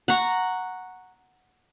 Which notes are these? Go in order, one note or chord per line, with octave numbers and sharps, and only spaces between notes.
F#5 A#5 C#6